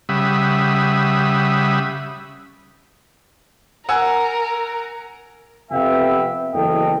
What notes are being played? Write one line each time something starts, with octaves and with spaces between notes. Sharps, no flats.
C#3 G3 E5 F#5 B5 D#6
A#4 F#5 G#5 E6
F2 C3 B3 E5 F5 G5
F#1 E2 A4 D#5 G5